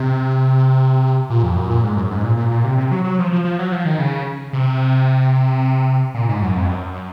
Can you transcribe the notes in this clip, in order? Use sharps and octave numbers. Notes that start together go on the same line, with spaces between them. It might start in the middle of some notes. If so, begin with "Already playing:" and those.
Already playing: C3
A#2
F2
F#2
A#2
G#2
F#2
G#2
A#2
A#2
A#2
C3
C3
F#3
F#3
F3
F3
F3
F#3
F3
D#3
C#3
C3
A#2
G#2
F#2
F2
F#2